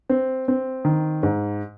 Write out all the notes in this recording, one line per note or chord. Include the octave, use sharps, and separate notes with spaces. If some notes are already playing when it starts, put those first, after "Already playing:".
C4
C4
D#3
G#2